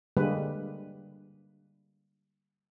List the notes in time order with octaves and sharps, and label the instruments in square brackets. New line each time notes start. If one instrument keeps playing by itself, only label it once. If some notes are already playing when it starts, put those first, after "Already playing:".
[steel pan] D3 G3 G#3 A#3 B4